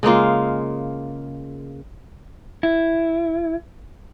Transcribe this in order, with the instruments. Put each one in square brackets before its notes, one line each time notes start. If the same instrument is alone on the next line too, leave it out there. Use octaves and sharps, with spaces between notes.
[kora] C#3 G#3 A#3 F4
[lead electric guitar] E4